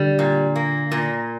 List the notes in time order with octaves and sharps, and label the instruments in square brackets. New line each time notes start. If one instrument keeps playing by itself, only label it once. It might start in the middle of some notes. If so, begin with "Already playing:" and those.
Already playing: [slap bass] D3 [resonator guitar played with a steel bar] G3
[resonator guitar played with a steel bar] A#2
A#3
A#2